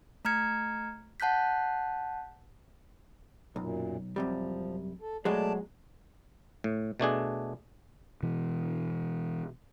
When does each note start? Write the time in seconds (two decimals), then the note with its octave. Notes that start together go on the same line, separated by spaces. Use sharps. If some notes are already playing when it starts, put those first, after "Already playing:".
0.25 A3 A#5 F6 G#6 C#7
1.20 F#5 A5 F#6 G6 B6
3.56 B1 F#2 A#2
4.16 F#2 C3 F3 G3
5.01 A4
5.25 B2 F#3 G#3 A3 D5 A5
6.64 A2
7.00 B2 A3 D4 G#4
8.23 B2 E3